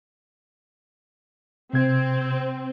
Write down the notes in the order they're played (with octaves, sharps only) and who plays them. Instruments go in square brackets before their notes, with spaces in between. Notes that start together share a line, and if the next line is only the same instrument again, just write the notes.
[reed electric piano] C3 G#6 [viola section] C4